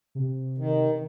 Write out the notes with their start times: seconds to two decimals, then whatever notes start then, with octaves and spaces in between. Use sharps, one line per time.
0.15 C3
0.58 D#3